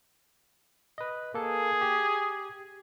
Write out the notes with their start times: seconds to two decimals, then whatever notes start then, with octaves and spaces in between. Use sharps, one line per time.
0.98 B4 D#5
1.34 A#3 G#4 A4
1.81 G4